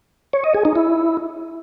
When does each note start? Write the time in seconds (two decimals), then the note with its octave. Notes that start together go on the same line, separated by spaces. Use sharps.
0.33 C#5
0.44 D#5
0.54 G#4
0.65 D#4
0.76 E4